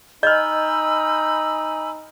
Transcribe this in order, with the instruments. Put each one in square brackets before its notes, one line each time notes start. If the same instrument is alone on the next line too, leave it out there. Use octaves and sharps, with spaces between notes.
[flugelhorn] D#4 [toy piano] D#5 [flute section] G#5 B5 E6 [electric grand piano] F6 G6